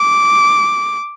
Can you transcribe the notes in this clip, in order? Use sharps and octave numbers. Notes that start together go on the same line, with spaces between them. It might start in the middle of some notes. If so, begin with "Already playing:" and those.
Already playing: D6